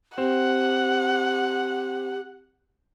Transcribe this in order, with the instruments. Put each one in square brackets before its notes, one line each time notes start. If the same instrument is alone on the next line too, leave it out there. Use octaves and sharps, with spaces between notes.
[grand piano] C4 [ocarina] G4 [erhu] F#5